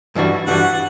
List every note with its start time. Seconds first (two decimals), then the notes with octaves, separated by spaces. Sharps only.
0.15 G2 E3 G3 D4 F#4
0.47 G2 E3 G3 D4 F#4 F#5